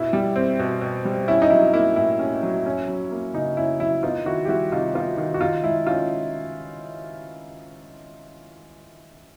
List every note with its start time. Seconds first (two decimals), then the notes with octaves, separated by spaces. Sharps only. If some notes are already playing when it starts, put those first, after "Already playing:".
Already playing: B2 E4
0.13 G3
0.36 C4
0.59 B2
0.81 B2
1.05 G3
1.28 C#4 E4
1.42 D#4
1.50 F#3 E4
1.74 A#3 E4
1.96 A2 E4
2.19 C#4
2.43 F#3
2.66 C#4
2.88 F#3
3.11 A#3
3.34 C#3 D#4
3.57 C#4 E4
3.80 F#3 E4
4.03 B3 D#4 F4
4.26 D#3 E4 F#4
4.45 G4
4.48 G3 E4 F#4
4.72 C3 D#4 F4
4.95 B3 D#4 F4
5.17 D#3 D#4 F4
5.34 F#4
5.41 D#3 D#4 F4
5.63 G#3 E4
5.87 C#4 D#4 F4